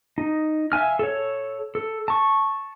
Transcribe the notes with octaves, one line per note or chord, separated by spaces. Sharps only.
D#4
E5 F5 G#5 F6
A4 C#5
A4
A5 C#6